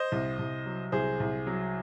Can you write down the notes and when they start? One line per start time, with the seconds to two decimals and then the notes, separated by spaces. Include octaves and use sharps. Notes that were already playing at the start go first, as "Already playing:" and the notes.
Already playing: C5 D#5
0.12 C2
0.39 C2
0.66 F#3
0.92 C2 G#4 C5
1.20 C2
1.47 F#3